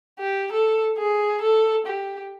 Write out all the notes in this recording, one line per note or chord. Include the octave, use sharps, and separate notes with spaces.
G4
A4
G#4
A4
G4